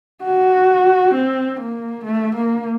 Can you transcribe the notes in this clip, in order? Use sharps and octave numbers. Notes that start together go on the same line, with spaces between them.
F#4
C4
A#3
A3
A#3